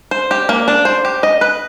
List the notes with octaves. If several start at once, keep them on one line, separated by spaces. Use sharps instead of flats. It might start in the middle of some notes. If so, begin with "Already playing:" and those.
C5
G4
A#3
D4
C5
G4
D#5
B4